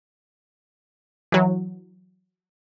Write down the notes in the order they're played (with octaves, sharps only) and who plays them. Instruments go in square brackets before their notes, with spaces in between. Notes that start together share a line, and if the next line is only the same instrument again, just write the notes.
[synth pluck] E3 F#3